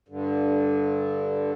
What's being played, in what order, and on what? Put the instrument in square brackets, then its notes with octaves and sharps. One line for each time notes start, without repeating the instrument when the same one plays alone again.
[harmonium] G2 D3